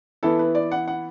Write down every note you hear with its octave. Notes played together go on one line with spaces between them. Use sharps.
E3 B3 E4 A4
B4
D5
F#5
F#5